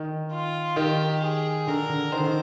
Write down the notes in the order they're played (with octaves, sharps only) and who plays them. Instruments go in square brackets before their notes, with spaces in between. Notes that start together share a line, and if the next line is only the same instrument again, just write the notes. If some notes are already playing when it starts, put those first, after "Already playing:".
Already playing: [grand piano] D#3
[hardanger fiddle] F4
[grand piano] D#3 [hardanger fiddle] G4
[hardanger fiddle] G#4
[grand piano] D3 [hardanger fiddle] A#4
[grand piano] D3
[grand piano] D#3 [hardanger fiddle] C5
[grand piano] D3
D#3